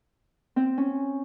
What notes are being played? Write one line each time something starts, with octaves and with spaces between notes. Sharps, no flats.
C4
C#4